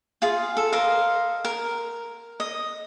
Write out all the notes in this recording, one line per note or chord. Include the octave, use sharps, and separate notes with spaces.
F4 G#4 F5
A4
A#4 C5 D#5 F5
A#4
D#5